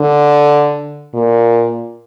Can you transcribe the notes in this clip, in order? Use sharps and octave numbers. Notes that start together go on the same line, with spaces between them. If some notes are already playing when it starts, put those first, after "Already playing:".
Already playing: D3
A#2